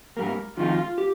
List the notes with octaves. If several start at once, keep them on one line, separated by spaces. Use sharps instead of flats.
G#2 G3 A#3 A#4
F2 D#3 G#3 F4
G4